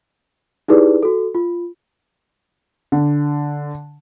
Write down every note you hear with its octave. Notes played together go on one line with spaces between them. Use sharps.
D#4 E4 G4 G#4 B4 D5
F#4 A4
F4
D3